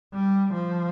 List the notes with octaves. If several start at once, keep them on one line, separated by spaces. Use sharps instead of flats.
G3
F3